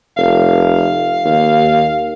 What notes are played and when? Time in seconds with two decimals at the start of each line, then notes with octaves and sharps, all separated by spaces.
0.17 F1 F5
1.25 D#2